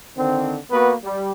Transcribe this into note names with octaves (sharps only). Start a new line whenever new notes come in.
D3 D#3 C4
A#3 B3 F#4 B4
G3